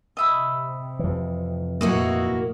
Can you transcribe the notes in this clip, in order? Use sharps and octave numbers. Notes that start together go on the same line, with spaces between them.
C3 D#5 E5 B5
F2 E3
F1 A#2 A#3 E4 F#4 D#5 C#6